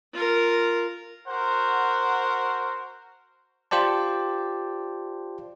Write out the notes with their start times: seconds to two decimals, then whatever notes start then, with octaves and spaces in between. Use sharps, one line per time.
0.13 F4 A#4
1.27 F#4 A#4 C5 F#5
3.71 F4 G4 C5 D5 A5